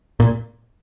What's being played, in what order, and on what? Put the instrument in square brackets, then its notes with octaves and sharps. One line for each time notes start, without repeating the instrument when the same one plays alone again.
[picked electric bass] A#2